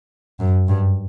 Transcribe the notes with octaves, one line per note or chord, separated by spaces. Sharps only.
F#2
G2